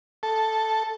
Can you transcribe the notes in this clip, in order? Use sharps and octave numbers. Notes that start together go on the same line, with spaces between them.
A4